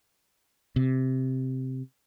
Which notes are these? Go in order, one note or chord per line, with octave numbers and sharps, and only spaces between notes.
C3